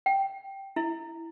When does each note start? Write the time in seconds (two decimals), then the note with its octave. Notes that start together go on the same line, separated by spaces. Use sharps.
0.06 G5
0.76 E4